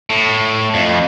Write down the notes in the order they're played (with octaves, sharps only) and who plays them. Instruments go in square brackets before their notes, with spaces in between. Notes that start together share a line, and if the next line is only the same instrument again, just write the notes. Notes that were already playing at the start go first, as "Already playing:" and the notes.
[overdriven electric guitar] A2
F2